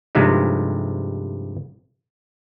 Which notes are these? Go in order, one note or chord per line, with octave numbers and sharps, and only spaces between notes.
G2 C3 F3 G#3 A3 D#4